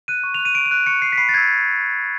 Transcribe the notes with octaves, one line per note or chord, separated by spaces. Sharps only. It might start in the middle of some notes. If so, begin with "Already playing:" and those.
F#6 D#7
C#6
F7
F#6
D#7
C#6 D7
D#7
F#6
C#6 C#7
F#6 C7
B6
B5 C7
A6
E6 G6 G#6